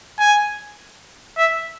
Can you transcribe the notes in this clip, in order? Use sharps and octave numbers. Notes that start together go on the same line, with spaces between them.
G#5
E5